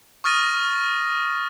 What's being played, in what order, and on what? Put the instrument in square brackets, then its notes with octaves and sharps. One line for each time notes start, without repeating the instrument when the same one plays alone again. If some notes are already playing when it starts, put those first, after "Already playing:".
[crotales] C#6 D#6 F6 A6 A#6 D#7